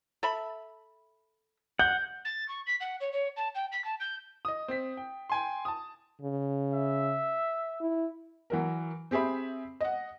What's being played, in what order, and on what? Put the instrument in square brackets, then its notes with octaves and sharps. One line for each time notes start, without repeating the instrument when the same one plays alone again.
[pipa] A4 E5 B5
[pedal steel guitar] F#5 [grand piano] G6
[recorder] A6
C#6
B6
F#5
C#5
C#5
A5
G5
B6
A5
G6
[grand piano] D#5 D#6
C4 B6
G5
G5 G#5 C6
A5 D#6
[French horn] C#3
[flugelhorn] E5
[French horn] E4
[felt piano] E3 F#3 A#4
C4 G4 G#4 E5 B5
D#5 F#5